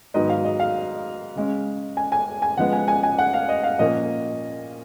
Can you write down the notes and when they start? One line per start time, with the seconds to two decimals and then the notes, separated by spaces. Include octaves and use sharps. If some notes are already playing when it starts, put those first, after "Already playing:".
0.14 G#2 D#3 F#3 B3 D#5
0.29 F5
0.45 D#5
0.60 F5
1.36 C#3 G#3 C#4
1.97 G#5
2.12 G#5
2.42 G#5
2.57 C#3 F3 G#3 B3 F#5
2.73 G#5
2.88 G#5
3.03 G#5
3.18 F#5
3.34 F5
3.49 D#5
3.63 F5
3.79 A#2 F3 A#3 C#4 D#5